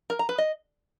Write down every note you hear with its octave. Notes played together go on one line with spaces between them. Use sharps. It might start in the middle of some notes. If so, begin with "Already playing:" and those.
A#4
A#5
B4
D#5